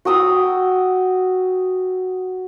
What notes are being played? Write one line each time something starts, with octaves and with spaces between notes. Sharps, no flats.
F#4 G5 D#6 E6